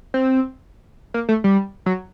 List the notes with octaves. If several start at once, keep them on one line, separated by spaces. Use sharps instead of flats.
C4
A#3
A3
G3
F#3